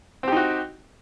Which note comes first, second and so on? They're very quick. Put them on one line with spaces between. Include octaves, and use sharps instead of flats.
C4 G4 D#4 F#4